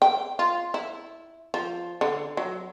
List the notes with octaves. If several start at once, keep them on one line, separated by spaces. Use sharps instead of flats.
G5
F4
E4
F3
D3
F#3